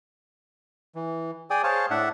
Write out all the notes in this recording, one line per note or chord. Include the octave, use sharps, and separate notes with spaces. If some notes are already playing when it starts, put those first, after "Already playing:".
E3
G#4 D5 G5 G#5 D#6
G#4 C5 C#5 F5 A5
A2 D4 E5 F#5